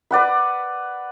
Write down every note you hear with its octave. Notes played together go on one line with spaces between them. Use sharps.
B4 D5 F#5 B5